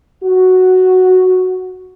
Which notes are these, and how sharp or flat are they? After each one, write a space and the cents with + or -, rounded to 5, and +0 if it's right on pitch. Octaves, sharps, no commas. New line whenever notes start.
F#4 +0